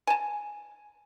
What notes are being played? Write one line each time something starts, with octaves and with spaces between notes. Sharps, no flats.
G#5 A5